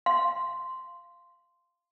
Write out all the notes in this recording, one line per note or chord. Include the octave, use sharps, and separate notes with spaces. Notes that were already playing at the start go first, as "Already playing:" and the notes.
F5 C6